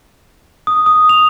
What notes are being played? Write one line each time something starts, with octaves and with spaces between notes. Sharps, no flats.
D#6
D#6
F7